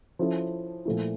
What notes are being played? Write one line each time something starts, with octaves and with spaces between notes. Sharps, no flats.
F3 C#4 E4 A4
A#2 F3 A3 E4